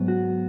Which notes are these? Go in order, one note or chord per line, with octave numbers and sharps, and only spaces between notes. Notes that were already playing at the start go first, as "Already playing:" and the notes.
Already playing: G#2 F#3 B3
F#4